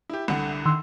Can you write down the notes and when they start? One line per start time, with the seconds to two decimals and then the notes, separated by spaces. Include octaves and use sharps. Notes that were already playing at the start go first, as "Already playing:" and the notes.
0.09 E4 G4
0.28 C2 D3 F#5
0.65 D#3 C6 E6